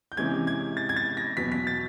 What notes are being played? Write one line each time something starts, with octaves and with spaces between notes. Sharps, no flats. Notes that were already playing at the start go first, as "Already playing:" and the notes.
G6
C3 E3 G#3 C#4 G#6
G#6
A6
G#6
A6
A#6
E2 B2 F#3 B3 B6
B6
A6